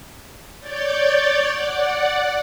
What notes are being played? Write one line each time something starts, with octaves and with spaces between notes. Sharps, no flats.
C#5 D5 G6 A6
D5 F#5